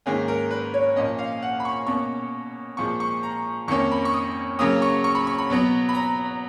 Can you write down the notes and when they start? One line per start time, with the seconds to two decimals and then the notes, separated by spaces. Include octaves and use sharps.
0.06 G#2 D#3 A#3 C#4 G#4
0.28 A#4
0.51 B4
0.74 C#5
0.96 A#2 F3 A#3 C#4 D#5
1.19 F5
1.42 F#5
1.60 B5
1.65 C#6
1.87 B2 A#3 C#4 C#6
2.77 A#2 F3 G#3 C#6
3.00 C#6
3.23 A#5
3.68 F2 D#3 A#3 C#4 C#6
3.92 B5
4.05 C#6
4.14 D#6
4.59 C#3 F#3 A#3 C#4 D#6
4.82 C#6
5.04 C#6
5.15 B5
5.27 C#6
5.38 B5
5.50 B2 F#3 B3
5.89 B5
5.95 A#5